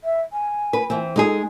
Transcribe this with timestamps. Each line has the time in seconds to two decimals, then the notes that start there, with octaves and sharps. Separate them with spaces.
0.04 E5
0.32 G#5
0.73 B4
0.90 E3 C4
1.16 G#3 D#4 G#4 A4